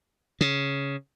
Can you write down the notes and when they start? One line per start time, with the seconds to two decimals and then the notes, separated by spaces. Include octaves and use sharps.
0.41 C#3